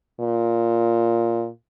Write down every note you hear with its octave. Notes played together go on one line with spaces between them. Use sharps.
A#2